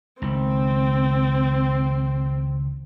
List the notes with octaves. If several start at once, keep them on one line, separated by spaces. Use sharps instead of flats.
C#2 D#3 C4